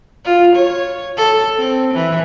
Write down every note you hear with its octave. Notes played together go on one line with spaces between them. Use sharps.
F4
C#5
A4
C4
E3